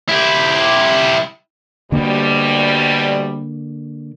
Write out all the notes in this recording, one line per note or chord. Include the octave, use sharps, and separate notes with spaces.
E4 G4
D2 B2 D3 G3 A#3